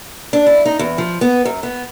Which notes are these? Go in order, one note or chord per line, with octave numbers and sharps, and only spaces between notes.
D4
E4
D#4
E2
F3
B3
F#2
B3